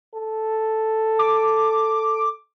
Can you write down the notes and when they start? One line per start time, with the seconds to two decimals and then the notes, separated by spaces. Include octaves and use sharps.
0.14 A4
1.19 D6